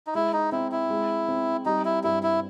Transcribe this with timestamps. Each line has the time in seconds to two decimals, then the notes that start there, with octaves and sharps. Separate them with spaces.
0.07 D#4
0.15 G#3 E4
0.33 D#4
0.52 C4 E4
0.72 E4
0.90 G#3
1.28 C4
1.66 G3 D#4
1.85 E4
2.04 G2 E4
2.23 E4